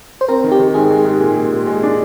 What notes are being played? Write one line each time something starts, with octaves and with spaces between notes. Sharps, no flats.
C5
C4 A#4
D#3
G4
D#3
G#2 G#4
G#3
G#2
A#2
A#2
A#2
G#3
D4